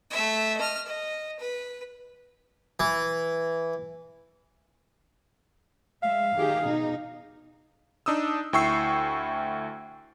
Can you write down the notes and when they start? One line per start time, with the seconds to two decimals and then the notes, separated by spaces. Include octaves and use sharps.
0.11 A3 E5
0.57 D#5 F6
0.86 D#5
1.40 B4
2.80 E3
6.03 G#3 E5 F5
6.35 D#3 G4 G#4
6.66 B2 D#4
8.06 D4 D#4 D#6 E6
8.53 D2 E4 G5 C#6 E6 C7